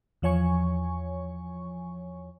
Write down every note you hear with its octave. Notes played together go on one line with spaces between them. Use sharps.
E2 F3 C#5 G#5 C#6